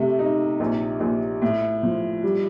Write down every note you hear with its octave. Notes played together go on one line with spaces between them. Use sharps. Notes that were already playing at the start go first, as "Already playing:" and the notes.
Already playing: C3 A3
D#4
A#1
A#1
A2
F3
G3